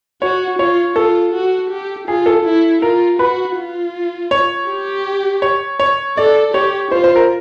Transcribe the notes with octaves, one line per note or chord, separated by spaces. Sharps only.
F#4 C#5
F4 C#5
F4 A4
F#4
G4
F4 G#4
A4
E4
F4 A#4
F#4 B4
F4
C#5
G4
C#5
C#5
A4 D5
G4 C#5
F4 C5
C5
A#4